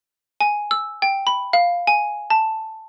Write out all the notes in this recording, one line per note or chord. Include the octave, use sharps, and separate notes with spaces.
G#5
E6
G5
B5
F5
G#5
A5